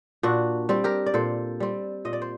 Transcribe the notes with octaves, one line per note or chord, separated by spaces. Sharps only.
A#2 D4 F#4
G3 C4
G4 A#4
D5
A#2 A4 C5
G3 C4
A#2 D#5
D5
C5